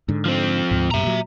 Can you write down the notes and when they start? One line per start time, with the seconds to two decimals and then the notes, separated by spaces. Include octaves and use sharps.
0.09 G#2 D3
0.25 F3 C4
0.71 D2 G#2
0.91 F#2 A#2 E5 A#5
1.03 A#2 F#3